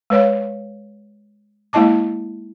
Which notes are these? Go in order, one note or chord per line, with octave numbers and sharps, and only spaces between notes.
G#3 B4 C#5 F5
G#3 A#3 E4 D#5 A5 D6